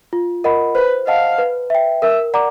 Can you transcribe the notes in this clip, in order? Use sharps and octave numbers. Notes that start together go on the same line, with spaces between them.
F4
A#4 D#5 F#5 B5
B4 C5
D#5 F5 F#5 A5
B4
E5 G5
A#4 E5
D5 F#5 A#5 D6